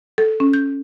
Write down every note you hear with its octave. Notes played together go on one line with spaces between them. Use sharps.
A4
C#4
G6